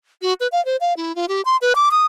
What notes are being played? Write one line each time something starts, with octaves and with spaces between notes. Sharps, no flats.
F#4
B4
F5
C5
F5
E4
F4
G4
C6
B4
D6
D#6